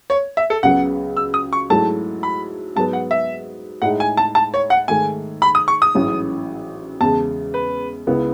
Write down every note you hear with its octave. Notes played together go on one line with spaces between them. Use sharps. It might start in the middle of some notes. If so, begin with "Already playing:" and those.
C#5
E5
A4
C#2 C#3 F#3 B3 F#5
E6
D#6
C#6
G#2 F#3 A3 E4 A5
B5
G#2 F#3 B3 A5
F#5
E5
A2 G#3 D#4 F#5
G#5
A5
A5
C#5
F#5
G#2 D#3 A3 G#5
B5
D#6
C#6
D#6
A1 G#2 F#3 C#4 E4
E2 C#3 G#3 A5
B4
C#2 C#3 G#3 B3 E4